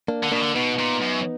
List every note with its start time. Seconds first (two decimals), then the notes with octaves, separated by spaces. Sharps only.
0.08 A#3 D4
0.23 D3
0.32 B2 A#3 D4
0.41 D3
0.55 B2 B3 D#4
0.79 A#2
1.02 F#2